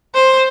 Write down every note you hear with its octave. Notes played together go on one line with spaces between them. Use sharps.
C5